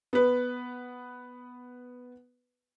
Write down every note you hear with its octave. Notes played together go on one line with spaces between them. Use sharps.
B3 B4